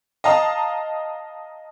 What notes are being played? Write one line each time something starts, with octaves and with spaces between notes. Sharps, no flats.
D#5 F5 A5 A#5 D#6